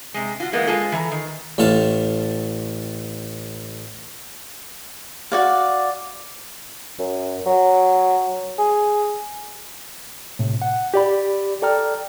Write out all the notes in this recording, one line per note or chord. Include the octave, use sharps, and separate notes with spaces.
C3 G#3
F4 F#4
E3 G#3 A#3 B3
G#3 F4 A4
E3 A#5
D#3
A1 A2 A4 F5 A5
F#4 D5 F5
F#2
F#3
G#4
A2 C3
F#5
G4 D5 B5
A4 D5 G5 A#5 F6